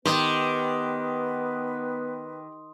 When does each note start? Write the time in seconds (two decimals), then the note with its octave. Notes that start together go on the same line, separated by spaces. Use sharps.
0.05 D#3 B3 G4 B4 C6 D#6